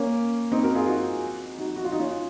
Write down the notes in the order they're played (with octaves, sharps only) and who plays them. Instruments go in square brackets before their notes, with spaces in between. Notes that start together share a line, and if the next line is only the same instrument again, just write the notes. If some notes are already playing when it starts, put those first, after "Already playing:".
Already playing: [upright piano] A#3 C#4
C4 D#4
F#4 A#4
F4 G#4
D#4 F#4
D#4 F#4
F#4
F4
D#4
C#4 F4